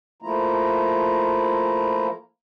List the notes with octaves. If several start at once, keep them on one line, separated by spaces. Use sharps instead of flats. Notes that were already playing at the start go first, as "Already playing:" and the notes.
F3 A3 A#3 E4 F4 A#5